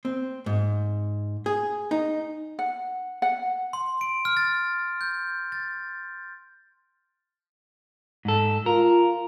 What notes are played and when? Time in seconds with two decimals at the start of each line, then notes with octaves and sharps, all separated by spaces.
0.05 C4
0.46 G#2
1.46 G#4
1.91 D#4
2.59 F#5
3.22 F#5
3.73 C6
4.01 D7
4.25 F6
4.37 A6
5.01 G6
5.52 A6
8.25 G#2 A4
8.66 F4 A#4